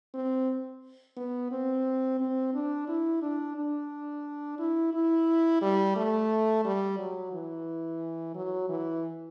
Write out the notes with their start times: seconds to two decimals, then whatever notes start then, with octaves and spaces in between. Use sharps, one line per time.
0.14 C4
1.17 B3
1.52 C4
2.20 C4
2.54 D4
2.88 E4
3.22 D4
3.56 D4
4.59 E4
4.93 E4
5.61 G3
5.96 A3
6.65 G3
6.98 F#3
7.32 E3
8.35 F#3
8.69 E3